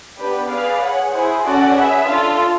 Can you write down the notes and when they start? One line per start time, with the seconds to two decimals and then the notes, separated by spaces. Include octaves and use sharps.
0.18 B3 D4 G4 B4
0.49 G#4 B4 D5 F5
0.81 G#4 C#5 F#5
1.12 E4 G#4 C5
1.44 C#4 F#4 A4 D5 F#5
1.75 G#4 B4 E5
2.06 D4 F4 A4